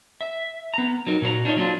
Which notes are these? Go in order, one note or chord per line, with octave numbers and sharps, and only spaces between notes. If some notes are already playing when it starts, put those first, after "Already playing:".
E5
B3 A#5
F#3 D#4 A#4
A#2 F#4 C5 A#5
D4 D#4 F4 C5 C#5 D#5
F#3 A#3 D4 F4